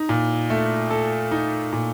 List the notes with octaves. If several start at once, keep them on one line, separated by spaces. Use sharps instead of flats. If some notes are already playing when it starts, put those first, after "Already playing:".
Already playing: D#4
A#2
A3
A4
D#4
A#2